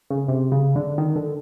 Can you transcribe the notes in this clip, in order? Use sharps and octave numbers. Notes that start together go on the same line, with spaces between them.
C#3
C3
C#3
D3
D#3
D3